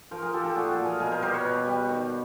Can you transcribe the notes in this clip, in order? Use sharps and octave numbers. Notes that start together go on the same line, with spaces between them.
F3 A#4 C5
G#4 A#4
F3 G4 A4
G4 A4
A#2 F#4 G#4
G4 A4
A#2
G#4 A#4
B2 G#4 A#4
A#4 C5
G3 A#4 C5
B4 C#5
B2
G3
D#3